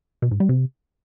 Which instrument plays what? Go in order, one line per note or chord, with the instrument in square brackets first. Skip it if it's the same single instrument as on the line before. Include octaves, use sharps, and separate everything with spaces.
[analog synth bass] B2
G#2
G3
C3